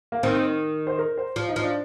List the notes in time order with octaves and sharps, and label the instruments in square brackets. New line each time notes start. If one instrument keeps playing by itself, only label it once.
[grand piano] A#3
[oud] D#3 [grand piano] C4
[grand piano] C5
A#4
C5
[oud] F3
[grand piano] D#4
[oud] F3
[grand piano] D4